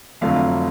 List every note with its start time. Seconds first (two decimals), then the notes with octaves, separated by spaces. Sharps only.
0.21 F1 F2 D3 F#3 A3 F5